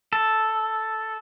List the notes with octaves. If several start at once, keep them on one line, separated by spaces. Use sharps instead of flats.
A4